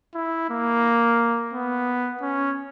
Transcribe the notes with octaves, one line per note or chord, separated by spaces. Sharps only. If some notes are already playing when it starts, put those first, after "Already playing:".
E4
A#3
B3
C#4